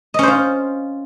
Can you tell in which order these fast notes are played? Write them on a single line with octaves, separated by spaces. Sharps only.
D#5 C#4 C5 F4